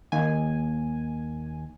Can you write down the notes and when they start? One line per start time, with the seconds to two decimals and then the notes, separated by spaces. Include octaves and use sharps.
0.12 D#2 G#5